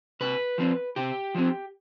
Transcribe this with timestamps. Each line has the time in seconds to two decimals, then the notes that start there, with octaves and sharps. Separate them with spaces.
0.21 C3 B4
0.58 F3 C4
0.96 C3 G4
1.35 F3 C4